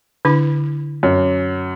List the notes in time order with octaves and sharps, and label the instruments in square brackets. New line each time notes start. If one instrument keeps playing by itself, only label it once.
[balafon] D3 D4 E4
[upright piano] F#2